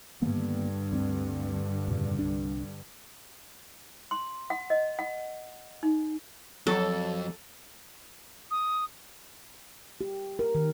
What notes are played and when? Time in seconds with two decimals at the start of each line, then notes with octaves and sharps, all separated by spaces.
0.22 G2 D3 D#3 A#3 B3
0.91 D2 A3 C4
1.88 F2 A#2 C#3
2.19 C2 D4
4.11 C6
4.50 F#5
4.70 D#5
4.99 F#5
5.83 D#4
6.67 F2 F#3 A4
8.51 D#6
10.01 G4
10.39 A#4
10.55 D#3